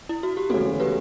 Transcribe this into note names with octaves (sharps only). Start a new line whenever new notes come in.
E4
F#4
G4
E1 D2 C#3 F#3 B3 F#4 A4
G4 B4